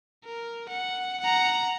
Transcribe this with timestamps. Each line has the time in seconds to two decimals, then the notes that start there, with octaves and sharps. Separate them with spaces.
0.25 A#4
0.69 F#5
1.21 F#5 A#5